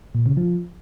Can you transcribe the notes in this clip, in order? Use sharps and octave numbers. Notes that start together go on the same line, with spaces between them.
A#2
C#3
F3